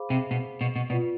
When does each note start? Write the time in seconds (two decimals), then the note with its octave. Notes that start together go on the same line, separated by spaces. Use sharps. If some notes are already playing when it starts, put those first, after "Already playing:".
Already playing: G#4 C5 F5 B5 D6
0.10 C3
0.31 B2
0.61 B2
0.76 B2
0.90 B2 F4 B4 D5